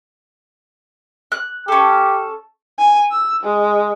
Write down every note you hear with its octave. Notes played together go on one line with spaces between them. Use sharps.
F#6
C#4 G4 A4
G#5
E6
G#3